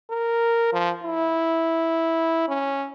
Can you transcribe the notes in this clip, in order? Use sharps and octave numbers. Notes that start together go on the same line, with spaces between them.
A#4
F3
E4
C#4